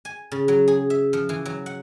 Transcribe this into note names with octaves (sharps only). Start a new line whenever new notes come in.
G#5
C#3
F#3
G#4
E5
F3
E3
F#3
F#5